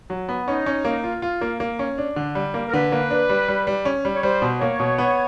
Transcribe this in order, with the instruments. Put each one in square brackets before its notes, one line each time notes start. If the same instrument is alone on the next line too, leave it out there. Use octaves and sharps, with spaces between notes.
[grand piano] F#3
B3
[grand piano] C#4 [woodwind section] D#4
[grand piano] C#4
A#3
F4
F4
A#3
A#3
C#4
D4
D3
G3
A#3
[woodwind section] A#4
[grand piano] D3 [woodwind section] B4
[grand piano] A#3
D4
G3
G3
G3
C#4
G3
[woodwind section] C#5
[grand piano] G3 [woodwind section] C5
[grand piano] B2
[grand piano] A#3 [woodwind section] C#5
[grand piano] B2
B3